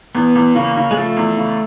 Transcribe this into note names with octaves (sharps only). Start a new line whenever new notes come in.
E2 B3
E2
C#3 A#3
C#3
G#3
F3 A3
E2
C#3